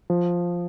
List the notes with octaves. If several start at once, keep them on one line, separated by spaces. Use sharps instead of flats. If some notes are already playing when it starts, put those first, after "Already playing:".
F3